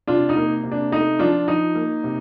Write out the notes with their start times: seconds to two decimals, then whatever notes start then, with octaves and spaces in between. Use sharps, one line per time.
0.07 C3 D4 F4
0.29 D#4
0.37 A#3
0.64 C3
0.71 D4
0.92 A3 D#4
1.19 F3 D4 F4
1.48 F3 D#4
1.75 A#3
2.04 C3